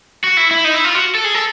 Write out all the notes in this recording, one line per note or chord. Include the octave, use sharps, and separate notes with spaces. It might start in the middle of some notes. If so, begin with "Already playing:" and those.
F#4
E4
E4
D#4
E4
F4
F#4
A4
G#4
A4